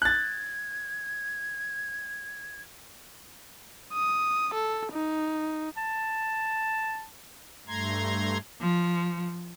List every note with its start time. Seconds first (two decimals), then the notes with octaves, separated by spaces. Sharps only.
0.02 F#6 G#6 A6
3.93 D#6
4.54 A4
4.92 D#4
5.77 A5
7.67 G2 A3 A#5 C6 G#6
8.62 F3